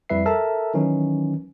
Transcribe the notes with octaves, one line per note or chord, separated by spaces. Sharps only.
F2 G3 E4 B4 E5 C7
A4 A#4 E5 A5
D#3 E3 F#3 C#4 D#4